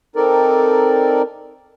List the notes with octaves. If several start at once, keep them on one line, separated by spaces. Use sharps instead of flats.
C4 D#4 A4 A#4 D5